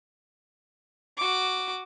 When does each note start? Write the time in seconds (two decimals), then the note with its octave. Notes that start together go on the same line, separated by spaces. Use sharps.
1.17 F#4 D6